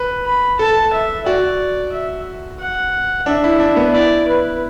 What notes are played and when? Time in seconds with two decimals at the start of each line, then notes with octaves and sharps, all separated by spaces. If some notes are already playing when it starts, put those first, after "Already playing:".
Already playing: B4
0.25 B5
0.59 A4 A5
0.93 E5
1.26 F#4 D5
1.92 E5
2.60 F#5
3.26 D4 E5
3.44 E4
3.60 D4
3.76 B3
3.94 E4 D5
4.28 B4